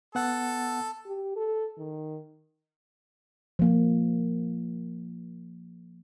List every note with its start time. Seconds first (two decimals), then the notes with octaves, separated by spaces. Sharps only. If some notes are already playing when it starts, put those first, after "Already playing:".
0.15 B3 A4 F#5
1.06 G4
1.36 A4
1.79 D#3
3.59 F3 A#3